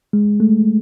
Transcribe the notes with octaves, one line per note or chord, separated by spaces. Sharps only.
G#3
A3